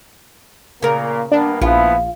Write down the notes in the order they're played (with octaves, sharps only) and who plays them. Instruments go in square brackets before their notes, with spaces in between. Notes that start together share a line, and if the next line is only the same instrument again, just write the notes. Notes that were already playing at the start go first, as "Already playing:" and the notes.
[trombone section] A#2 A#3 [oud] C#3 A#4
[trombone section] G2 A#3 B3 [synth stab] D4
[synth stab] A#1 [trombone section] F3 B3 E4 [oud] F4